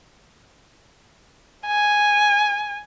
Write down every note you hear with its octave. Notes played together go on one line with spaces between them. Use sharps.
G#5